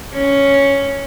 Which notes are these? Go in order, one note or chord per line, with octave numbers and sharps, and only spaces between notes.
C#4